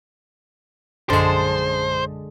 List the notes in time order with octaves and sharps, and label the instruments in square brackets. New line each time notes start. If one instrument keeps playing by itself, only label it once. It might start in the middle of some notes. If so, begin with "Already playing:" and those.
[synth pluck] A#1 F#2 A5 [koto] D3 G#3 [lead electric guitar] C5